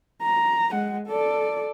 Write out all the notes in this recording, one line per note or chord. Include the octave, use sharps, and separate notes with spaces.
A#5
G#3 F#5
A4 D5